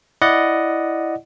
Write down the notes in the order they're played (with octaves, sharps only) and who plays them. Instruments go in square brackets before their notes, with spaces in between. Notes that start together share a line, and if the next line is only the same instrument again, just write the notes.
[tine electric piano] E4 D5 D#5 F#5